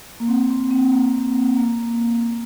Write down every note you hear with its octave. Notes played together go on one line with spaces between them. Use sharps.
A#3
C4
C4
C4
A#3
A#3